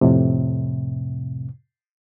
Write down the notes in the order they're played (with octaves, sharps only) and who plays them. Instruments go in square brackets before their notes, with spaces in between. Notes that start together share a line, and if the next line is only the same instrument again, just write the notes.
[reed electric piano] F2 A2 C3